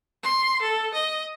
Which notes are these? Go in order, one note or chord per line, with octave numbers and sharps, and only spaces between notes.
C6
A4
D#5